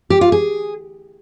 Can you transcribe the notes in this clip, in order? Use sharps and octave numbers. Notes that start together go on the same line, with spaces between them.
G4
F4
G#4